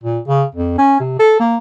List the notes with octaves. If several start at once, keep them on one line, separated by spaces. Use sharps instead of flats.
A#2
C#3
F2
C#4
C3
A4
A#3